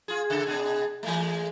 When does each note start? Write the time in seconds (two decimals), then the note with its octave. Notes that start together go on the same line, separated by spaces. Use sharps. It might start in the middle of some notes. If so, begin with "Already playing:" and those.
0.08 F4 G#4
0.30 C#3 A4
0.45 B2 D4 G#4
1.03 E3 G#3 A3